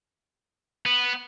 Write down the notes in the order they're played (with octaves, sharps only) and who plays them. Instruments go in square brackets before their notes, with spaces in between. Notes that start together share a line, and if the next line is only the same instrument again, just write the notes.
[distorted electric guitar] B3